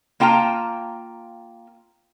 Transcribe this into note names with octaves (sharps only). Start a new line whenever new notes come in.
A#3 F4 G5 A5 A#5